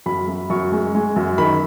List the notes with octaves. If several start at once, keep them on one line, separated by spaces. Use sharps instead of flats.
F#2 B5
F#2
F#2 C#6
G#3
G#3
F#2
D#3 B5